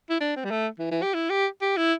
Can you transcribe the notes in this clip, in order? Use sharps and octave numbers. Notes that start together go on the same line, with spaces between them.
E4
D4
C4
G3
A3
E3
E3
G4
E4
G4
G4
E4